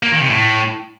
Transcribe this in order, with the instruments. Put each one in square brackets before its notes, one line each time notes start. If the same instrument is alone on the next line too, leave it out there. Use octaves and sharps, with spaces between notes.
[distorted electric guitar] A#3
D#3
C3
A2